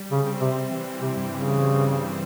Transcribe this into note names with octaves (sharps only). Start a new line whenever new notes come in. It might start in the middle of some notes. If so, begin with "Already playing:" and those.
Already playing: G3
C#3
C4
C3
E3
C3
G2
C#3
G3
C4